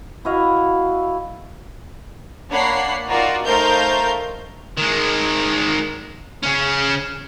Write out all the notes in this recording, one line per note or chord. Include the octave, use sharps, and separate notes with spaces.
E4 F#4 D#5 F5
A#3 D4 C#5 F#5 B5 C7
D#4 F4 F#4 A#4 D5
A3 D#4 A#4 C5 F5 G6
D#3 G#3
C#3 C#4